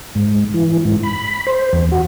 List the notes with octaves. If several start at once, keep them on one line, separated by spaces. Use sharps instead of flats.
G#2
E3
G#2
B5
C5
E2
F#4